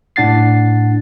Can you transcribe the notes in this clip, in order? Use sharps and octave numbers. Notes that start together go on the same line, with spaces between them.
A2 D4 F#5 A6 C7